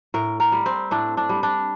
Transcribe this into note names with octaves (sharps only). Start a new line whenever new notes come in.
A2 A#4
A#4
G3
C4
A2 D4
D4
G3
D4